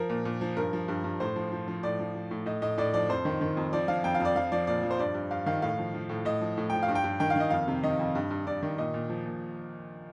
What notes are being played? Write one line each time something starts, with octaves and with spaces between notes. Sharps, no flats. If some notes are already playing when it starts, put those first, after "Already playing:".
Already playing: F3 A#4
A#2
A#2
F3
G2 A#4
F3
G2
G2
A2 C5
F3
F3
F3
A2 D5
F3
F3
A2
A2 D#5
A2 D#5
A2 D5
F3 D5
F2 C5
D#3
D#3
F2
F3 D5
F3 F5
F2 G5
F5
F2 D5
F3 F5
F3 D5
A#2 D5
F3
C5
G2 D5
G2
G2 F5
D#3 F5
A2 F5
F3
F3
A2
A2 D#5
F3
A2
F3 G5
F5
G2
G5
G2
D#3 G5
F5
D#3 D#5
F2 F5
C3
D#3 D#5
F2
G2
G2
G2 D5
D#3
A#2 D#5
A#2
F3
A#2